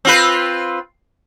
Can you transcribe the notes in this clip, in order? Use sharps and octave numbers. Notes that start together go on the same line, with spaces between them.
C4 F4 B4